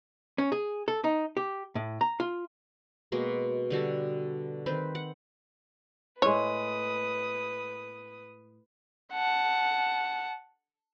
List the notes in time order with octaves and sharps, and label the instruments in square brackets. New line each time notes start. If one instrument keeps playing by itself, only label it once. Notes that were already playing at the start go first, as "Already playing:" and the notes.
[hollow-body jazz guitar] C#4
G#4
A4
D#4
G4
A2
A#5
F4
[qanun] B2 G#3 A#3
D3 G3 F#4 A4
D#3 C4 B4 C5
F#5
[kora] A2 G#3 [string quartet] B4 D#6 [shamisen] C#5
[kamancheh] F#5 A5